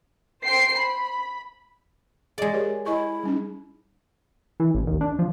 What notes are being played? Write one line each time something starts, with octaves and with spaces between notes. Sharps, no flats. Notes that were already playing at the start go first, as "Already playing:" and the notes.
C5 G5 C7
B5
G#3 G#4 D5 D#5
G4 A#4 C#5
E4 D#5 G#5 C#6
G3 C#4 D#4
E3
A1
D#2
D4
F3